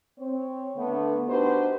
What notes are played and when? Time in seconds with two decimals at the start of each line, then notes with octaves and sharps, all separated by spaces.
0.18 C4 C#5
0.76 D3 A3 B3
1.27 D4 D#4 F#4 G4 B4 C5